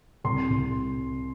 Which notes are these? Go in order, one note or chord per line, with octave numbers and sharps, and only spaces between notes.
C2 C6
C2